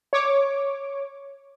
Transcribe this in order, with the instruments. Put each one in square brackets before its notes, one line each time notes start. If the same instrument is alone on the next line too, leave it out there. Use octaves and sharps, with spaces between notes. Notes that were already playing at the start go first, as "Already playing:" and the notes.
[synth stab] C#5 D6